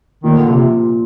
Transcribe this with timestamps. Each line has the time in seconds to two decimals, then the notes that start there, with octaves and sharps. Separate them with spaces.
0.24 A#2 D#3
0.38 D3
0.48 C3 F3